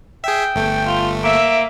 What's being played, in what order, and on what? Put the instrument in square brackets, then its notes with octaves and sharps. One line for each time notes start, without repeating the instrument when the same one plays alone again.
[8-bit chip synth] G#4 E5 [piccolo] G5
[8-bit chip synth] G1 A3
[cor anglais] F4
[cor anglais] A#3 [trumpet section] E5 [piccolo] D7